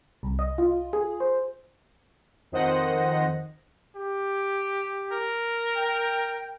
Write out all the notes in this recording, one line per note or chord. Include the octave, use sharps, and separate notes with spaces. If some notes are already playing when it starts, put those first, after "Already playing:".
C2
D#5
F4
G#4
C5
F2 D#3 C5 D#5 F#5 A#6
G4
A#4
G5